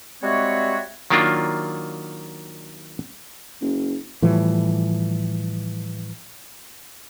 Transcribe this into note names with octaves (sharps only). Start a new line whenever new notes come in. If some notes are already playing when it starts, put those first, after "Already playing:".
G3 G#3 C4 F#4 C#5 E5
D#3 F#3 A#3 D4 F4
F#1
A2 E3 F3 G3